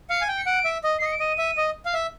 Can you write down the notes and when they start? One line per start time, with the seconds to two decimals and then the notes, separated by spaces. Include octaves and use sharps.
0.10 F5 C#7
0.21 G#5
0.28 G5
0.38 C#7
0.46 F#5 D7
0.65 E5
0.84 D#5
0.99 C7
1.02 D#5 C#7
1.13 D7
1.20 D#5 D#7
1.38 E5
1.57 D#5
1.85 F5
1.94 E5